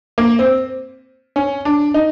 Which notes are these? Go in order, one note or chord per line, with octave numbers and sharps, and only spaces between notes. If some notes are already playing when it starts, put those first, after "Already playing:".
A#3
C4
C#4
D4
D#4